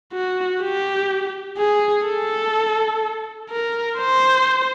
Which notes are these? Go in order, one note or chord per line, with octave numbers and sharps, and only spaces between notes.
F#4
G4
G#4
A4
A#4
C5